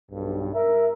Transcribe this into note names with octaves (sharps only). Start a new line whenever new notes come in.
B1 G2
A#4 E5